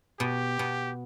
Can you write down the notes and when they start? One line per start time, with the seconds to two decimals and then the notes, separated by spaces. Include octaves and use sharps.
0.20 B2 G4
0.59 B2